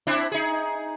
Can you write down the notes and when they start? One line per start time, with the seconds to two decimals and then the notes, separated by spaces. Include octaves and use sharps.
0.07 C4 D4 E4
0.32 D#4 G#4